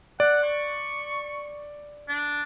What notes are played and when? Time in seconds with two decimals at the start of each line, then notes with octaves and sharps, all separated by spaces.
0.20 D5 F#5
0.43 C#6
2.08 D4